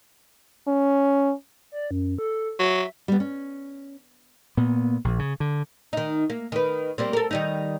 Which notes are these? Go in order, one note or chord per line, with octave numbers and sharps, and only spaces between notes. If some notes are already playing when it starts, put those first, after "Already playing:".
C#4
D5
F#2
A4
F#3 E5
G3 B3
C#4
A#2 B3
A#1
C#3
D3
D#3 D#4
A#3
D#3 B4
G3 A#3 C4
A4 A#4
D#3 G3 D#4